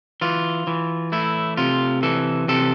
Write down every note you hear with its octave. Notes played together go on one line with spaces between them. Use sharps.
E3 F4
E3
A3 E4
C3 F4
E3 A4
C3 A4